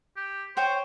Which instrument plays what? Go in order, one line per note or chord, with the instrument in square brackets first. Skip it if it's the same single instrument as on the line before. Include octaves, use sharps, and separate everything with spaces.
[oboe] G4
[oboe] C5 [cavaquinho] C#5 G5 C#6